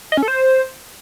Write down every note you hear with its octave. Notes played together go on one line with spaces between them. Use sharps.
D#5
C#4
A4
C5